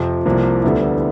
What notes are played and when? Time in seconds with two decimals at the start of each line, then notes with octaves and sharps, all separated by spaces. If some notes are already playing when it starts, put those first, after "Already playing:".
Already playing: F2 C3 F3
0.26 C2 C3 F3 A#3
0.63 D2 D3 G3 B3 E4